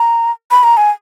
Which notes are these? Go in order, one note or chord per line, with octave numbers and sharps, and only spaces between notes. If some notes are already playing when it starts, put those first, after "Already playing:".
Already playing: A#5
B5
A#5
G#5